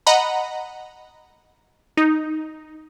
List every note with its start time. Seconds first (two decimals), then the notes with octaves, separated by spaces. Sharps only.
0.07 D#5 F#5 A#5 B5
1.97 D#4